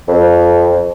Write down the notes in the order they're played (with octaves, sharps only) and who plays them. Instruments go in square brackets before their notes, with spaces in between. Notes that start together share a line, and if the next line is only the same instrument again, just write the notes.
[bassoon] F2